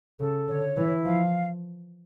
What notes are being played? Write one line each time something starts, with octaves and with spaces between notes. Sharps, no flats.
C#3 A4
D3 C#5
E3 E4
F3 F5